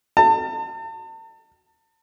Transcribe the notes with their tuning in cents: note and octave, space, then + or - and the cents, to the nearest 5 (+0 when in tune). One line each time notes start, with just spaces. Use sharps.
A5 +40